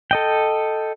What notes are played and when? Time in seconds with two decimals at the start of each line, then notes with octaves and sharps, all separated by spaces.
0.11 A4 D#5 G5